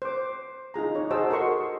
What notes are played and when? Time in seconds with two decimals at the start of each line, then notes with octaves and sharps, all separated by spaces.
0.02 C5 D6
0.74 D#4 F4 G#4 A#5
0.95 D#4 C#5
1.10 F#4 G#4 C5 D#5 A5 E6
1.29 F#4 A4 A#4 D#5 C6 C#6